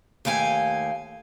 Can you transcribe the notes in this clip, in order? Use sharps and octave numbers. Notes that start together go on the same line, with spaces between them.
D#2 A3 F5 G5 G#5